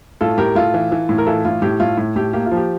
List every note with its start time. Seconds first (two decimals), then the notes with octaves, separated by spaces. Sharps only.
0.21 A2 F4 A4
0.38 A2 G4 A#4
0.55 A2 F4 A4
0.74 E3
0.92 E3
1.09 A2
1.18 A#4
1.27 E3 F4 A4
1.45 A2 F4
1.62 A2 G4
1.80 A2 F4
1.97 A2
2.16 A2 G4
2.33 A#3 G4
2.46 F4
2.51 F3
2.57 G4